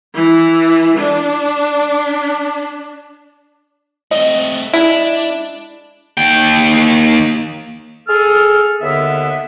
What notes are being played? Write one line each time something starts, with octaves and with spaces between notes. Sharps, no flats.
E3
D4
A3 C4 D#5
G#3 D4 E4
D#2 G5
G#4 A4 F6
D#2 D3 B3 E5